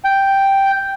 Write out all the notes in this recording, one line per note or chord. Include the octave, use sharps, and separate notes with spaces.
G5